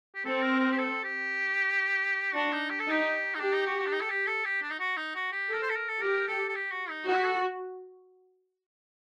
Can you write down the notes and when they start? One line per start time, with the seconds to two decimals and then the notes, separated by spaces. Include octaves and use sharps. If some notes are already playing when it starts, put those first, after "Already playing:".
0.15 G4
0.25 C4 A4
0.42 A#4
0.60 A#4
0.72 G4
0.78 A4
1.04 G4
2.34 D4 F#4
2.53 D#4
2.70 G4
2.80 A4
2.87 D#4 G4
3.35 D#4
3.39 D4 G4
3.53 D#4
3.66 F#4
3.79 F#4
3.86 D4
3.92 D#4
4.01 A4
4.10 G4
4.27 A4
4.45 G4
4.62 D4
4.71 D#4
4.80 F#4
4.97 D#4
5.15 F#4
5.32 G4
5.49 A4 A#4
5.62 C5
5.70 A4
5.76 A#4
5.89 A4
6.02 G4 A#4
6.28 A4
6.49 A4
6.55 G4
6.72 F#4
6.89 D#4
7.07 D#4 F#4
7.17 G4
7.24 A4